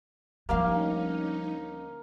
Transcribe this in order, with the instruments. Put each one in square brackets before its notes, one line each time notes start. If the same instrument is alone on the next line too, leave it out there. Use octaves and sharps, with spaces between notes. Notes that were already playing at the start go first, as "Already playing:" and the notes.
[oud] D2 G4 F5 [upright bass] F3 G3 [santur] A#3 [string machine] C#4 D#4